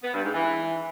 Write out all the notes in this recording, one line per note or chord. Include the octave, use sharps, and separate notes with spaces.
B3
G2
G#2
E3